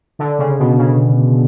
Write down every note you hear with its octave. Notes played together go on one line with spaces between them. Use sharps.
D3
C#3
B2
C#3